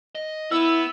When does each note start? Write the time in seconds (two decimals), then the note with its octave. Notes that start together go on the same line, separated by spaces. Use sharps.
0.15 D#5
0.51 B3 E4 E6